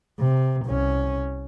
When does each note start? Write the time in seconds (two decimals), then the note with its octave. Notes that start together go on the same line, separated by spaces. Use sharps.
0.19 C3
0.65 C2 C#4